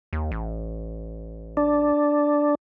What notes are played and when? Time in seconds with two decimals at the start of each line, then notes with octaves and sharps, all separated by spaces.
0.13 D#2
0.31 A1
1.57 D4